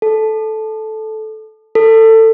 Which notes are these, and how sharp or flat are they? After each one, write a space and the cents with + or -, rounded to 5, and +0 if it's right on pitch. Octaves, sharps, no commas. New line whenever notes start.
A4 -10
A4 +25